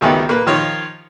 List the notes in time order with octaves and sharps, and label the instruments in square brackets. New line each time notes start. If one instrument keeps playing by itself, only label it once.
[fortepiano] G#1 C#2 D#3 A3 B3 G4
A#3 B4
D#3 F3 D#4 F4 C#5